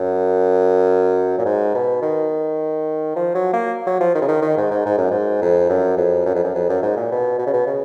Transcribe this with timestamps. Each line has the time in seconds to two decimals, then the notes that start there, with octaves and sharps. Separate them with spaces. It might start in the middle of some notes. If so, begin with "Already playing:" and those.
Already playing: F#2
1.38 A#2
1.45 G#2
1.74 B2
2.02 D#3
3.16 F3
3.35 F#3
3.53 A#3
3.87 F#3
4.00 F3
4.15 D#3
4.21 C#3
4.28 D#3
4.42 D#3
4.57 G#2
4.71 G#2
4.86 G#2
4.98 F#2
5.11 G#2
5.42 F2
5.70 F#2
5.97 F2
6.26 F#2
6.35 F2
6.44 F#2
6.55 F2
6.69 F#2
6.83 G#2
6.97 A#2
7.12 B2
7.39 B2
7.47 C#3
7.54 B2
7.67 C#3